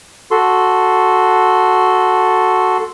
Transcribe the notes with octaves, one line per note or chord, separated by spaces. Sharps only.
F#4 A4 C6